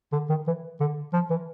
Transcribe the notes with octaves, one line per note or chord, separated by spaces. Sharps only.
D3
D#3
E3
D3
F3
E3